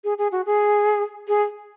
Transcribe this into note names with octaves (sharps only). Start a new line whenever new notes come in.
G#4
G#4
F#4
G#4
G#4